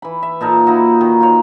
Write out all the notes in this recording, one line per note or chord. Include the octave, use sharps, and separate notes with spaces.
E3 B5
E5
A#2 D#4 A4 A#4
A#3 D#4 E4 F#4
D#3
F4 C#5